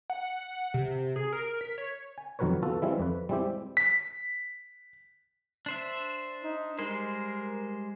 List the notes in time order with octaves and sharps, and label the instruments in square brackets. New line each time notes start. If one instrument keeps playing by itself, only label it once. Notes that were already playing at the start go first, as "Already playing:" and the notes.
[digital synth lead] F#5
C3
G#4
A#4
B6
C#5
[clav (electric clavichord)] G#5
F2 D#3 F#3 A#4 B4 C#5
B3 F4 F#4 A4
E3 G3 G#3 C4 E4 F4
F2 B4
G3 G#3 C4 E4 G4
[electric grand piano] B6
[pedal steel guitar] D4 C5 E5
[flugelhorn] D#4
[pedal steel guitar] G3 G#3 C5 [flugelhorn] A#4